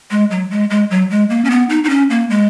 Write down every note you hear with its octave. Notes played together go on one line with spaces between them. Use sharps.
G#3
F#3
G#3
G#3
F#3
G#3
A#3
C#4
B3
D#4
D#4
C#4
A#3
G#3